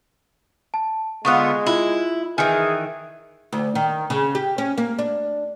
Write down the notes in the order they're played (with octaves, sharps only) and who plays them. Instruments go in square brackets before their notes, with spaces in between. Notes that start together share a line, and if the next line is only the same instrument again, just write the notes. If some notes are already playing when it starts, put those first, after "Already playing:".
[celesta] A5
[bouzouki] D3 B3 F4 [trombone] G#3 [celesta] C#6 D#6 F#6
[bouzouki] E4 [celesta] F4
[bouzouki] D#3 E3 [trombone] G#4 [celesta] G#5
[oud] D2
D#3
C#3
G4
C#4
A#3
D4